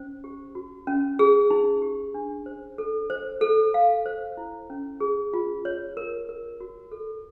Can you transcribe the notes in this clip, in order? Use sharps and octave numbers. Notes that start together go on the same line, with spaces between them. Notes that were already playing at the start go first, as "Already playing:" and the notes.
Already playing: C#4 C5
G4
F#4
C#4
G#4
D#4
G4
D4
C5
A4
C5
A4
F5
C5
E4
C#4
G#4
F4
C#5
A#4
A#4
F#4
A4